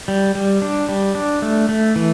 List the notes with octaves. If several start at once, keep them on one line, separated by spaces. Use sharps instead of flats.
G3
G3
D4
G3
D4
A3
A3
E3